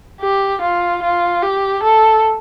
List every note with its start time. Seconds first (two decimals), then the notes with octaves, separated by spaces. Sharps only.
0.21 G4
0.62 F4
1.03 F4
1.42 G4
1.83 A4